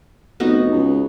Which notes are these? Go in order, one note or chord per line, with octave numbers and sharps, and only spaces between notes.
F1 B3 D#4 F#4
C#2